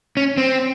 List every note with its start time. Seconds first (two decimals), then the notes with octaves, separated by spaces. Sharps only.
0.17 C#4
0.38 C4